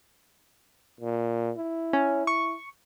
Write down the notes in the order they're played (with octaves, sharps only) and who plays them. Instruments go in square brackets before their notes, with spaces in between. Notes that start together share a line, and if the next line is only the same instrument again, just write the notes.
[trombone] A#2
E4
[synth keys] C#4
C#6